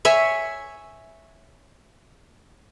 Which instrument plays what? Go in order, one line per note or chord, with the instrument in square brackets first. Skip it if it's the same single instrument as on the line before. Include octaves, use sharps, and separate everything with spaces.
[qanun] C#5 E5 G#5